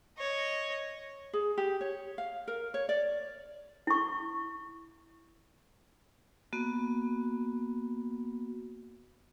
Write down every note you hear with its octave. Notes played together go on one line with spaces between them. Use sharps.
C#5 D#5
G#4
G4
C#5
F5
A#4
C#5
D5
E4 C#6
A#3 B3 F#4